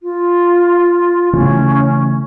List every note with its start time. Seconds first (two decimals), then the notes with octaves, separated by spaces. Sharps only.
0.03 F4
1.33 C#3 E3 A3 C#4